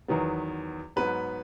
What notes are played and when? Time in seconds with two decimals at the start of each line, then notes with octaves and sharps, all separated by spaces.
0.08 E2 D#3 F#3 B3
0.96 G#2 F#3 B3 B4